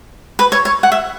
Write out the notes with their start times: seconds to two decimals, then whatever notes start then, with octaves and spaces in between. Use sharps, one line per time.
0.39 B4
0.52 C#5
0.65 C#5
0.83 F#5
0.92 E5